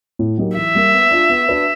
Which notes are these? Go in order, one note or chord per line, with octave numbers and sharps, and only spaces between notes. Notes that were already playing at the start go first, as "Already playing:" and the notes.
A2
F#3 A#3 D#4 G4
E3 E5
G3 A#3
B3
D4 F4
B3
D4 F#4 B4